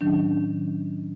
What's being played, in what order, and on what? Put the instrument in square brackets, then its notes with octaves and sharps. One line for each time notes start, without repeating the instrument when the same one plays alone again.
[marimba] A2 D#3 F#3 C#4 D4